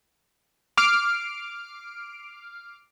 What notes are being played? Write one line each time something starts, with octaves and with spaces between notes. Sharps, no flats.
D6 F6 C7 D7